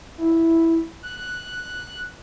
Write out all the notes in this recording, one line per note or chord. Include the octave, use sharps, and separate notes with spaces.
E4
F#6
F#6